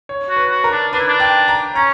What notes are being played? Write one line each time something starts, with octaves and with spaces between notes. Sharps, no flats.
C#5
F#4
B4
F#4
A#4
D4
D4 B4
E4
D4
G5
A#5
C#4 A#5